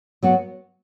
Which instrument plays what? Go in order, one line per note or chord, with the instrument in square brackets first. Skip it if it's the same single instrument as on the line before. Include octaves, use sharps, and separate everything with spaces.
[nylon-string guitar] F#3 B3 F#4